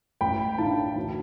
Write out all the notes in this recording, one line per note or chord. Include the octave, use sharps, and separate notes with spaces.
A1 G5 B5
A2 E3 A3 D4 F5 A5
D2